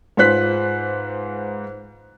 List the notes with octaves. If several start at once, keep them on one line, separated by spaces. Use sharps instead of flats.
G#2 F4 B4 C5 F#6 B6